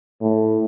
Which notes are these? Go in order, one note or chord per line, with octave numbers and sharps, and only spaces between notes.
A2